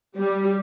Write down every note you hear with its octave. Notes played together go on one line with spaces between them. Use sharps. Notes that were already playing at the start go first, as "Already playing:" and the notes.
G3